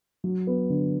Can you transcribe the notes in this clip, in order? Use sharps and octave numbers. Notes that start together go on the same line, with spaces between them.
F#3
B3
D3